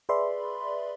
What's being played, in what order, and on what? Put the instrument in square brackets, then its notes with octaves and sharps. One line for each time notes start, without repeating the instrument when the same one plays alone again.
[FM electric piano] G#4 B4 D5 E5 B5 C6